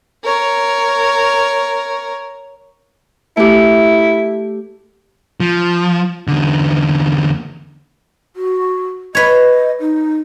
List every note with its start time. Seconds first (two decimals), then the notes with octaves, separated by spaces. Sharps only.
0.24 A#4 C#5
3.37 A3 E4 G4
5.40 F3
6.28 E2 D3
8.36 F#4
9.15 B4 C#5 D#5
9.80 D#4